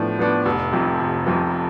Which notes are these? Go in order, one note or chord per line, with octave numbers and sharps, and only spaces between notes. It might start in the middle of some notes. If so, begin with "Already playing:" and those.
Already playing: A2 F3 B3 D4
F3 B3 D4
F1
F2 C3 F3
F1
F2 C3 F3